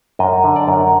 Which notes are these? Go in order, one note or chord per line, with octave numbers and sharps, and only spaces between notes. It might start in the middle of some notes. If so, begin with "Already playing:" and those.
F#2 D#5
D3
D5
F#2